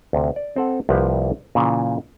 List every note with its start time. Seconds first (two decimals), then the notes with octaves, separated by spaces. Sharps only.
0.13 D2 C3
0.36 D5
0.56 C4 A4 F#5
0.89 C2 F3 A#3 G4 B4 F5
1.55 A#2 C#3 E3